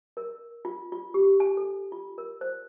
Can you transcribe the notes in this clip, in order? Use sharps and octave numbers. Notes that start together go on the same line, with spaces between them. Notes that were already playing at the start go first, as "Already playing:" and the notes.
A#4
F4
F4
G4
G#5
A4
F4
A#4
C5